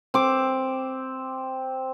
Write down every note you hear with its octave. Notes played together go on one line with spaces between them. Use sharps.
C4 D6